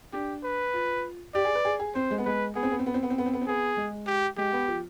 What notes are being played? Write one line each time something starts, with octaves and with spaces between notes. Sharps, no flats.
D4 G4
B4
F4
G4 D5
G#4
B4
G#4
G#4
C4 C5
G#3
B3
G#3 B4
B3 G#4
C4
B3
C4
B3
C4
B3
C4
B3
C4
B3
C4
B3 G#4
G#3
G4
G#3 G4
B3
F3